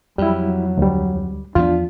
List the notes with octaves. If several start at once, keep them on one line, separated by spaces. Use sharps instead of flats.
F2 F#3 G3 E4
D2 G3
E2 F3 B3 D4 F4